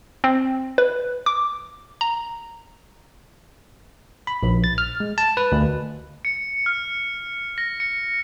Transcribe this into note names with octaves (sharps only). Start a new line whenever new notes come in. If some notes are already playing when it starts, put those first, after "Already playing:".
C4
B4
D6
A#5
B5
A#1
A6
F6
G#3
A5
B4
D2
C#7
F6
A#6
C#7